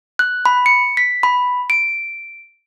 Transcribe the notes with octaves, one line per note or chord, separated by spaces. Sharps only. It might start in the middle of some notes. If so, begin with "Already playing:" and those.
F#6
B5
C#7
B6
B5
D7